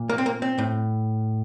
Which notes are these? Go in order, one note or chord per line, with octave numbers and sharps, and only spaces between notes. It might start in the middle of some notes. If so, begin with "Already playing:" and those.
Already playing: A#2
A#3
C4
A#3
C4
A2